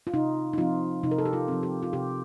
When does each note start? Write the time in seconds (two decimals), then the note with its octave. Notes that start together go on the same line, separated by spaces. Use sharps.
0.07 F4
0.13 C3 D#4
0.53 D#4
0.58 F3 C4 F4
1.03 C3 D#4
1.11 A#4
1.18 A4
1.26 G4
1.33 F4
1.48 F3 C4
1.63 G4
1.83 F4
1.93 C3 G4